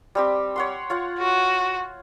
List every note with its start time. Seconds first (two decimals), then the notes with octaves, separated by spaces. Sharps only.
0.15 G3 C4 G4
0.56 C#5 F#5 C6
0.90 F4 C#5 F#5
1.19 F#4